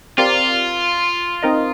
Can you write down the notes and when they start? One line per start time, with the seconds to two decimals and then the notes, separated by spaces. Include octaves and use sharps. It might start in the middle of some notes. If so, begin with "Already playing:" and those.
0.18 C4 F4 G4 A#4 D5 F5
1.43 C4 D#4 A#4 D#5